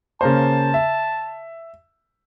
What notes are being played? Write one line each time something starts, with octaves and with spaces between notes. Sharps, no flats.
C#3 A#3 C5 A5
E5